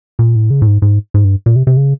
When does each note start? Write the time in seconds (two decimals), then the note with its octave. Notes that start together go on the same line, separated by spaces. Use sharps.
0.19 A#2
0.35 A2
0.50 C#3
0.62 A2
0.67 G#2
0.82 G#2
1.14 G#2
1.24 G2
1.46 A#2
1.56 C3
1.67 C3
1.77 C#3